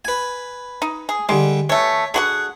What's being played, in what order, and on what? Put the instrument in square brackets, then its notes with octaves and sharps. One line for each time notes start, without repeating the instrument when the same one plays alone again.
[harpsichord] B4 G#5
[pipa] D#4
G#4
[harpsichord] D3 G3 [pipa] G#3
[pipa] E3 A3 [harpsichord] C#5
[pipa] D3 F#4 F#5 [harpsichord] G#4